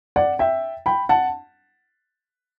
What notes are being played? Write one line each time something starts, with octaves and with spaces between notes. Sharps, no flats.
D5 F#5
E5 G5
G5 B5
F#5 A5